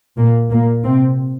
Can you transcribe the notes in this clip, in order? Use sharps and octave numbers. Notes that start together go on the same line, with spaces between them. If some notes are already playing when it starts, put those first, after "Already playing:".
A#2 A#3
A#2 A#3
C3 C4